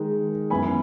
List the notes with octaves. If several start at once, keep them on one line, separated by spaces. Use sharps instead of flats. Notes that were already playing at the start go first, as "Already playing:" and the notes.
Already playing: D#3 G#3 D#4
F#2 E3 B3 G#5 B5